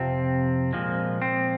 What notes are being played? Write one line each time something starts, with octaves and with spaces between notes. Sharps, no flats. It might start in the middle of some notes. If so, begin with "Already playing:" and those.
Already playing: F2 C3 F3 C4
A#2 F3 G#3
C4